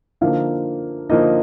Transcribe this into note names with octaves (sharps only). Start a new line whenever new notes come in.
D3 F3 A#3 D#4 F5
D3 F3 A#3 D#4 D#5